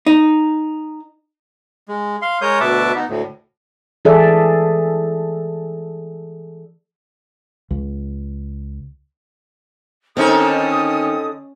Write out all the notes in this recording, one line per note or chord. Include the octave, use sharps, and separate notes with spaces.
D#4
G#3
F5 C6
G#3 A#4 C#5 D#6 G6
D2 B2 B4 E5 A5 D6
B3 D#4
D2 A2
E3 G#4 A4 D5 E5
C#2
D3 D#3 C4 C#4 D#4 A4 D#6